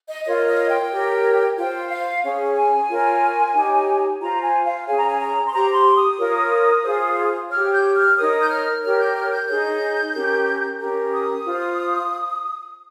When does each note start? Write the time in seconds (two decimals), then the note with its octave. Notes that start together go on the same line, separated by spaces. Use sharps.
0.08 D#5
0.25 F4 A#4 C#5 D#5
0.47 D#5
0.70 G5
0.91 G4 A#4 C#5
1.57 F4 C5 G5
1.90 F5
2.23 C#4 G#4 C#5
2.56 G#5
2.88 F4 A#4 C#5
3.54 D#4 G4 C#5
4.20 F4 C5 A#5
4.42 G#5
4.65 F5
4.86 C#4 G#4 C#5 G#5
4.96 A#5
5.07 G#5
5.20 A#5
5.46 C6
5.52 G4 C5 A#5
5.74 C6
5.97 D#6
6.18 F4 A#4 C#5
6.84 F4 G#4 C5
7.50 G4 C#5 F6
7.72 G6
7.94 F6
8.16 D#4 A#4 C#5 D#6
8.41 G6
8.49 F6
8.82 G4 A#4 C#5 F6
8.98 G6
9.15 F6
9.31 G6
9.47 D#4 G#4 C#5 G6
10.13 C#4 G4 A#4
10.80 C#4 G4 A#4
11.13 D#6
11.45 F4 C5